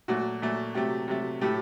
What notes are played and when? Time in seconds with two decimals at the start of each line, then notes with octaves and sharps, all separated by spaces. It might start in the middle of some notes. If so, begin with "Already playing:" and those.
0.08 A#2 F#3 A3 F#4
0.42 A#2 F#3 A3
0.75 C3 F#3 A3 G4
1.08 C3 F#3 A3
1.41 A2 F#3 A3 G4